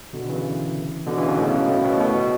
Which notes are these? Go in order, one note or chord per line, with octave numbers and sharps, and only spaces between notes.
B2 D3
C#3 E3
B2 D3
C#3 E3
B2
A2 C#3
B2
A2
B2
B2
A2